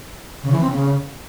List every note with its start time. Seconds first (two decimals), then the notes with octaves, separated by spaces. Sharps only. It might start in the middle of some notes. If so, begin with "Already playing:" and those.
0.43 C#3
0.52 E3
0.61 C4
0.70 C#3